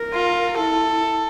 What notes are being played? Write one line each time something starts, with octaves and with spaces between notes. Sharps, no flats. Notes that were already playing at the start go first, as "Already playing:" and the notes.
Already playing: A#4
F4
E4 A4